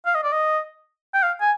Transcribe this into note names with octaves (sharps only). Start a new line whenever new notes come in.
F5
D#5
D5
D#5
G5
F5
G#5